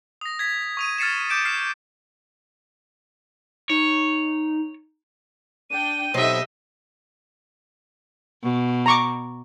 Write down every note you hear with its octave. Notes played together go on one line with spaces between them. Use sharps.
D#6 A#6
G#6 B6
C#6 D#6 D#7
F6 A6 C7 C#7 E7
D6 G6 D7 E7
F6 C7 E7
D#4 C#5
D4 G5 D#7
B2 F#3 C4 D#4 G4 A4 D#5 E5
B2
A#5 C#6 D6